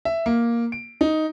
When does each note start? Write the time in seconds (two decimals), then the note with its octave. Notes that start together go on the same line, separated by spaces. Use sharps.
0.05 E5
0.26 A#3
0.72 D7
1.01 D#4